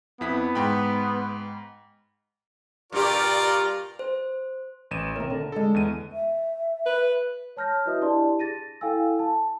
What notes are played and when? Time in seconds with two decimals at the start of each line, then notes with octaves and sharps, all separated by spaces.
0.21 F2 B3 E4 B6
0.55 G#2 G5 B5
2.92 G2 A#2 F4 G4 A#4 D5
3.99 C5
4.91 A1 D#7 E7
5.16 D#2 C3 A#4
5.30 D3
5.52 D3 G#3 A4
5.74 E2 D#7
6.13 E5
6.86 B4
7.57 C#5 A5 F6 G6 A#6
7.86 E4 F#4 B4 D#5 E5 D#6
8.01 D4 E4 G4 D5 A5 C6
8.39 G#4 A6 A#6 D#7
8.81 E4 A4 F5 G5 G#5 E6
9.19 A5